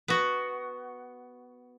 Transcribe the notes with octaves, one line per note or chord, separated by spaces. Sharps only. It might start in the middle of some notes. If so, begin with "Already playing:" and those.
B3 F#4